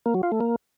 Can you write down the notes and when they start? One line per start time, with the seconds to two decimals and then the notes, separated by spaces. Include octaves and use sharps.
0.06 A#3
0.14 F#3
0.23 F4
0.32 A3
0.41 A#3